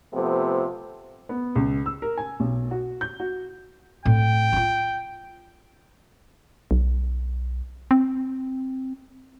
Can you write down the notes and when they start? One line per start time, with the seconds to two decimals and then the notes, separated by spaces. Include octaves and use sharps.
0.12 C3 F3 A3 B3
1.29 B3
1.56 C#2
1.86 E6
2.02 A#4
2.18 G#5
2.40 B1
2.71 F#4
3.01 G6
3.20 F#4
4.05 A2 C4 G5
4.53 D#4 F4
6.71 B1
7.91 C4